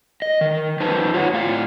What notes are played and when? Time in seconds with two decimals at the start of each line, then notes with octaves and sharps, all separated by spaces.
0.22 D#5
0.41 D#3
0.80 F2 G3 D#4 B4 C5 A5
1.14 F4 C#5 F#5
1.33 A2 F5